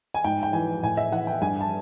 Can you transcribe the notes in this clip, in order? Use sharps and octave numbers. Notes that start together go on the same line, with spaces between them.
G#5
G#2 G5
G5
E3 G#5
A2 G#5
E5
E3 F#5
G5
G2 G#5
A5